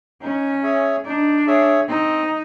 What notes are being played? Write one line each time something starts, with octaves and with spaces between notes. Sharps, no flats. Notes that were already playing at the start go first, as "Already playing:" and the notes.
C#4 D#4
G#4 C#5 E5
D4 D#4
G#4 C#5 E5
C4 D#4